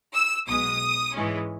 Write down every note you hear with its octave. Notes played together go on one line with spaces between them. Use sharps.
E6
B1 B2 G#3 D#6
G#2 E3 G#3 C#4